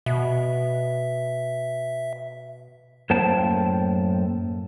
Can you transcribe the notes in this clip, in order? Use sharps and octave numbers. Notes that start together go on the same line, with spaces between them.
B2 E5
F#2 A2 A#3 C5 G5 A5